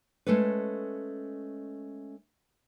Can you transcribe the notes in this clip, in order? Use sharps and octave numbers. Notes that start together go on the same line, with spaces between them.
G#3 A3 C#4 A4 B4